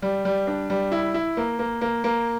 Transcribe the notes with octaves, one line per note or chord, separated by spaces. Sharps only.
G3
G3
D4
G3
E4
E4
A#3
A#3
A#3
A#3